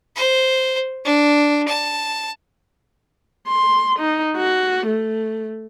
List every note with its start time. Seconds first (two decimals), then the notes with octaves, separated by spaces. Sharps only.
0.16 C5
1.05 D4
1.68 A5
3.48 C6
3.99 D#4
4.37 F#4
4.86 A3